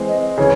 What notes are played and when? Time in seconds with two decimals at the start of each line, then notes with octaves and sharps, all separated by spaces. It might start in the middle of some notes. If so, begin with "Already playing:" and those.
Already playing: E3 G#3 C4
0.09 D#5
0.38 C#3 E3 C#5